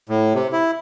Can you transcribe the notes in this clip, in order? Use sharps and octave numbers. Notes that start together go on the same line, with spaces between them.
A2
C3
E4